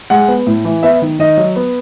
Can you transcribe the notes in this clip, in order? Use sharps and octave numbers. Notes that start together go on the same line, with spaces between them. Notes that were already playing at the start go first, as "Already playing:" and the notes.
G#3 F#5
B3
A2
E3
B3 E5
D#3
D#3 D#5
F#3
B3